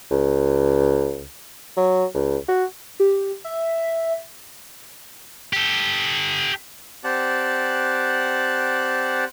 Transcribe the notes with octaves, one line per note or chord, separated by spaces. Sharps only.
C#2
F#3
C#2
F#4
G4
E5
G4 A4
C4 G4 D5 F#5 A5 F#6